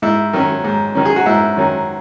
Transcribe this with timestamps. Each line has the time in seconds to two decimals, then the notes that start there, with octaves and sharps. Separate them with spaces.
0.02 G#2 E4
0.33 D#3 F#3 C#4
0.64 G#2
0.95 D#3 F#3 C#4
1.05 G#4
1.16 F#4
1.26 G#2 E4
1.56 D#3 F#3 C#4